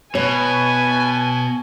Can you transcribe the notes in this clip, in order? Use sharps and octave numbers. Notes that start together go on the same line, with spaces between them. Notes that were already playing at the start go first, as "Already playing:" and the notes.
B2 B4 C#5 G#5